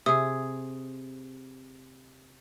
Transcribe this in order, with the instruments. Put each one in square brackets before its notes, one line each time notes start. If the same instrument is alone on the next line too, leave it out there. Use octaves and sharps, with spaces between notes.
[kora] C3 G#4 [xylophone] D#6